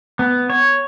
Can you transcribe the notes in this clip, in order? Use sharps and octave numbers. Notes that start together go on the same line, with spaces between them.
B3
C#5